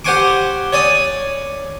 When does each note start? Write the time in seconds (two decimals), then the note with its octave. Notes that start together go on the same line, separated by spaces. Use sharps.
0.05 G4 C5 F#5 G#5 C#6 D6
0.73 C#5 D5 G#5 D#6